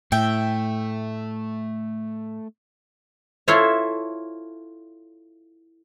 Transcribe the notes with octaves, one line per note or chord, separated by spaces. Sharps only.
A2 A3 E5 G5
E4 F4 A4 C5 C#5 E5